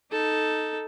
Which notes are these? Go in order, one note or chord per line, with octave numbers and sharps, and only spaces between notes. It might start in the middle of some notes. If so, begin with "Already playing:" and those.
D#4 A4